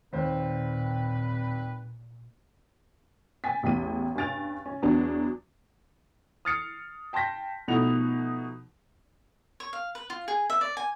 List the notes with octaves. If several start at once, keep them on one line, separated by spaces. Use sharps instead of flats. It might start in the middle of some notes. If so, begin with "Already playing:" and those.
D#2 A#2 G3 C4 B4 C5
G5 G#5 A6 B6
A1 E2 G5 B6 D#7
G2 C#4 G#5 A6 D7 F7
C#4
E2 F#3 B3 D4
D#6 F6 A6 C7 C#7
G5 A5 C6 G6 A#6 B6
B2 F3 A3 B3 D#4 F7
C#5
F5
B4
F4
G#4
E5
D5
G#5